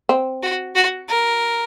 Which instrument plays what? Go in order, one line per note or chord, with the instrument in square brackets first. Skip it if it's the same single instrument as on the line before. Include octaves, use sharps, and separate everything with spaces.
[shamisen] C4
[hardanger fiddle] F#4
F#4
A#4